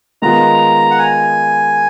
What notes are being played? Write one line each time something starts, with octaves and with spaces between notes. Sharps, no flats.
D#3 G#3 B3 F4 A#5
F#5
G#5